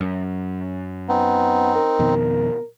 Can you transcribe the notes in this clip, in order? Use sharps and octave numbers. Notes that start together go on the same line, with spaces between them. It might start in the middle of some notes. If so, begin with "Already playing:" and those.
F#2
B3 C4 D#4
A#4
F2 B2 D#3